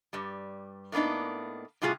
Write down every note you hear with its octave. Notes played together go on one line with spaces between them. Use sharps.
G2 G3
A2 A#3 B3 D4 D#4
A2 C3 G3 F4 F#4 G#4